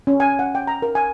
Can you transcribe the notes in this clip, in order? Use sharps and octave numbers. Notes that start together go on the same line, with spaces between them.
C#4
G#5
F#5
G5
A#5
A#4
G#5